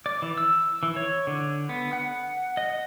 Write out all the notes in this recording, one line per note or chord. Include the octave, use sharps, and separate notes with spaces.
D5
E3
E6
E3
C#5
D3
B3
F#5
D#5